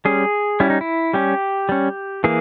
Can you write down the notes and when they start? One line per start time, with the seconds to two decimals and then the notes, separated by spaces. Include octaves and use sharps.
0.05 G3 C#4 G#4
0.60 G3 C#4 E4
0.70 D#4
0.81 E4
1.13 G3 C#4 G4
1.69 G3 C#4
2.24 E3 A#3 G#4